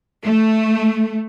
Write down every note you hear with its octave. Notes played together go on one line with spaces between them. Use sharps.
A3